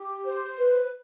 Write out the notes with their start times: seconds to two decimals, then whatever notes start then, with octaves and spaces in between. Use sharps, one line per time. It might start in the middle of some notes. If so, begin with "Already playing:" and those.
Already playing: G4
0.25 C5
0.58 B4